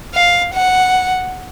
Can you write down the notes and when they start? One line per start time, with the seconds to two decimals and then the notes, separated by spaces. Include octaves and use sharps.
0.15 F5
0.54 F#5